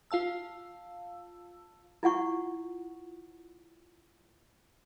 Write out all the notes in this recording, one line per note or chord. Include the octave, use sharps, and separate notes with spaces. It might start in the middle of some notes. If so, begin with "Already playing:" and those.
F4 F5 A5 E6
E4 F4 F#5 C#6